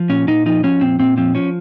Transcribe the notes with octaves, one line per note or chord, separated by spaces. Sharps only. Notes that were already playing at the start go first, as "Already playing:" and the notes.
Already playing: F3
A#2 C#4
A#2 D#4
F3 D#4
F3 C#4
A#2 C4
A#2 C4
F3 C4
F3 C#4